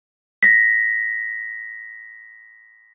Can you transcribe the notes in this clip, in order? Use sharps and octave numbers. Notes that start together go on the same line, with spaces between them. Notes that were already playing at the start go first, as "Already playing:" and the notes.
A#6 B6